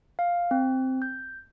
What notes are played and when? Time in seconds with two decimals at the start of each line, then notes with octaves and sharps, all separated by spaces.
0.19 F5
0.51 C4
1.02 G6